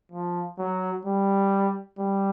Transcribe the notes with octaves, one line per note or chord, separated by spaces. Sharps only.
F3
F#3
G3
G3